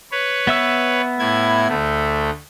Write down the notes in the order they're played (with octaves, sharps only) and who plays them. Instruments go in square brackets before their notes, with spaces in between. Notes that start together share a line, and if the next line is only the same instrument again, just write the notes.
[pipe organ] B4 C#5
[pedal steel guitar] B3 E5 E6
[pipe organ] A2 E4 G#6
D2 A3